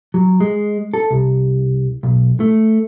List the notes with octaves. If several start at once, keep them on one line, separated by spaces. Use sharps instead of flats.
F#3
G#3
A4
C2
B1
A3